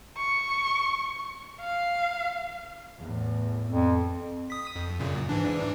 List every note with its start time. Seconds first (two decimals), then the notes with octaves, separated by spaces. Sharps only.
0.17 C#6
1.60 F5
3.00 E2 A2
3.69 F2
4.50 D#6 B6
4.76 F2
5.00 F#2 A#2 C#3
5.29 G#2 E3 D4